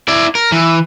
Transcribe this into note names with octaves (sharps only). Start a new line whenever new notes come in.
E4 D5
A#4
E3